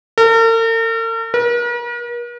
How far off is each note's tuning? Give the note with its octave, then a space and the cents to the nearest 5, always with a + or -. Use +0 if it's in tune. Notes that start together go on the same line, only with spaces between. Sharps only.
A#4 -45
A#4 +45